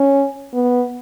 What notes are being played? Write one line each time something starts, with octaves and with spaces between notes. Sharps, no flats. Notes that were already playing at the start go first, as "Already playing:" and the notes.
Already playing: C#4
B3